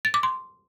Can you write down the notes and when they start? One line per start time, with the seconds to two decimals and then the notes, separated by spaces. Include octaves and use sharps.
0.05 A6
0.14 D6
0.23 C6